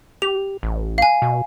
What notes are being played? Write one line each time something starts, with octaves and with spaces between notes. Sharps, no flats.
G4 F7
A1
F5 G#5
B2